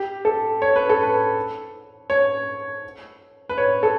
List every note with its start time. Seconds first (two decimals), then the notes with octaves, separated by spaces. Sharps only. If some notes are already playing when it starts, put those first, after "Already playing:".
Already playing: G4
0.25 A4
0.62 C#5
0.76 B4
0.89 A4
1.03 B4
2.10 C#5
3.49 B4
3.58 C#5
3.83 A4